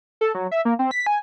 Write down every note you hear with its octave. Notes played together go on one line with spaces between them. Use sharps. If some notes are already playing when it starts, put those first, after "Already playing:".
A4
F#3
E5
A#3
C4
B6
G#5